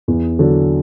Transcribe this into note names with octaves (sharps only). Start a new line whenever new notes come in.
E2
D3 F#3